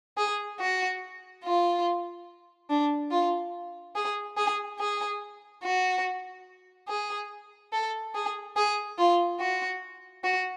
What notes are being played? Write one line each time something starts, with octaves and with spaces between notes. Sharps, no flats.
G#4
F#4
F4
D4
F4
G#4
G#4
G#4
F#4
G#4
A4
G#4
G#4
F4
F#4
F#4